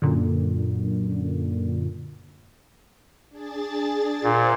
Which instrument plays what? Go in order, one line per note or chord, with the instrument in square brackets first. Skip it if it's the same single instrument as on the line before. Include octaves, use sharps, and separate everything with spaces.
[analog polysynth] F#2 A#2 D3
[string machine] D4 G#4 A6
[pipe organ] A#2 [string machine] C5 E5 F#5